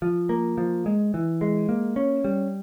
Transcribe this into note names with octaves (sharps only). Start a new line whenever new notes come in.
F3
A#3
F3
G#3
E3
G#3
A#3
C#4
G3